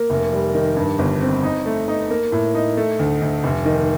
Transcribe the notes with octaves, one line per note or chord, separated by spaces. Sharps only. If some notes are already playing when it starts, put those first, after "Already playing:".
Already playing: A#3
F1
G3
D#3
G2
G1
C4
D#4
A3
D#4
A#3
A2
D#4
A3
D2
D2
F1
D#3